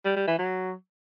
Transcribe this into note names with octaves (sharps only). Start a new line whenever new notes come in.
G3
G3
E3
F#3